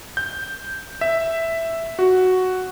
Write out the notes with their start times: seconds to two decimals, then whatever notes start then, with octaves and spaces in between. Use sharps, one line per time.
0.17 G6
1.01 E5
1.99 F#4